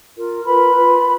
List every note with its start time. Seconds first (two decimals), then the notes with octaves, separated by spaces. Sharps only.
0.16 F4 A#4
0.45 F4 A#4 B4 B5
0.74 F4 B4